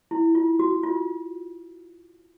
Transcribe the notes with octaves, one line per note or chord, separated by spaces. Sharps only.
E4
F4
F#4
F4